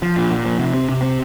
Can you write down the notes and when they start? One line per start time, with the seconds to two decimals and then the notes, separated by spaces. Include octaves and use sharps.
0.02 F3
0.17 A#2
0.31 A#2
0.45 F3
0.59 C3
0.74 C4
0.89 C3
1.02 C4